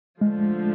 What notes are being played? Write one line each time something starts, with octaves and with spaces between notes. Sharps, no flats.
D3 F3 G#3 A3